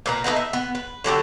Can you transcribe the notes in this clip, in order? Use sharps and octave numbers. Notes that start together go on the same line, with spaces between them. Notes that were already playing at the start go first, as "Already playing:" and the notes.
A#2 B4 A#5
D3 A3 B3 D#4
E5
B3
B4
D3 F#3 G4 A4